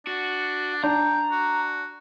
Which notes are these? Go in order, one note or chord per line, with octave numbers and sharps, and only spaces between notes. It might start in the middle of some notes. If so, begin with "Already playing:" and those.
D4 F#4
D4 G5 A#5
F#4